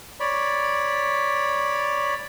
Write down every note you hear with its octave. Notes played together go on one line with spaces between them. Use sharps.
C#5 D5 B5